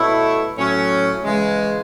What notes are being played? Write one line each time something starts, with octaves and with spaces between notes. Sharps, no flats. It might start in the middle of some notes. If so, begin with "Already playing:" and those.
Already playing: B2 A3 E4 A4 C#5
A2 F#3 C#4
C#3 E3 G#3